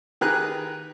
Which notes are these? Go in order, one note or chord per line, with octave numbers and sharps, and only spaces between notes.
D#3 G4 G#4 B4 A#5 F#6